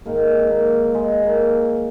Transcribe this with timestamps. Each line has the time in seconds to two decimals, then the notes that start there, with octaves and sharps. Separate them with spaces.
0.05 G#2 D#3 A#3
0.50 A#3
0.94 G#3
1.23 A#3